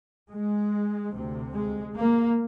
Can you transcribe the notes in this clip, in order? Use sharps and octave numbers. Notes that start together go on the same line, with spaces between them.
G#3
D2 C3
G#3
A#3